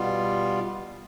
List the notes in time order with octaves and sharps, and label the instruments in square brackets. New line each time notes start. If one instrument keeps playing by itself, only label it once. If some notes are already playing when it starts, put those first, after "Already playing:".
Already playing: [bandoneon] B2 G3 B3 F4